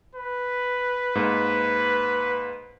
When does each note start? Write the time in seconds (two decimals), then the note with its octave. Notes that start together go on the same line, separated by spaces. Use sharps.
0.15 B4
1.15 G#2 A#3